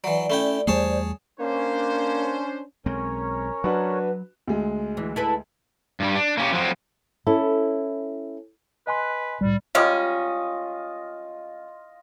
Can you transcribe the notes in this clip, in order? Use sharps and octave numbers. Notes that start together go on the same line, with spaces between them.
E3 F#3 D5
A3 C#4 E4 G5
E2 G3 A3 G#4 C5 C#5 A5
A#3 C#4 D4 C5
B1 G#3 C4 C#4 A#4 C#5
F#3 D4 F#4 B4
D2 G#3
E3
E4 A4 B4
G2 G3
D4
A#3 C#4 G4
F3 F#3 C4
C#4 E4 A4
B4 D#5 G#5 C6
C2 A2 G3
G3 G#3 C#4 F4 D#5